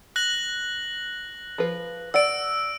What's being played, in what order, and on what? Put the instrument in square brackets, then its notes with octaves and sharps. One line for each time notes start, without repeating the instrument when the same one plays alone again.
[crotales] F#6 A#6 F#7
[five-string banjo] F3 B4
[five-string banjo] D5 F#5 [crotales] E6 D7